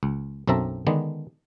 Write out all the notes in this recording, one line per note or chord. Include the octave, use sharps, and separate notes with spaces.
C#2
B1 F#2 C4 A4 E5 A#5
D3 D#3 G#3 B3 D4